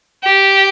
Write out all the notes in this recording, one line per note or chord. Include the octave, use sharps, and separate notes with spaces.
G4